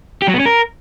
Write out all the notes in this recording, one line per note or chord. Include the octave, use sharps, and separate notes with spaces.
G4
F#3
B3
C#4
A#4